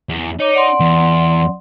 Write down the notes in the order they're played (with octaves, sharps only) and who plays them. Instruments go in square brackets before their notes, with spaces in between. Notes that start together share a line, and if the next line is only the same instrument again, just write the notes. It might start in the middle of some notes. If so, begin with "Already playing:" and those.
[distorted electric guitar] E2
[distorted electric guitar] D#4 [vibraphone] C#5 D6
[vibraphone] D5 F#5 C6
[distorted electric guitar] E2